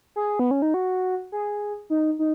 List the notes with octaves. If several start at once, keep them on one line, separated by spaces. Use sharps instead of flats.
G#4
B3
C#4
D#4
F#4
G#4
D#4
D#4